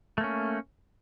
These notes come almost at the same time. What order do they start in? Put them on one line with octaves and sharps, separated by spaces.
A3 A#3 C#4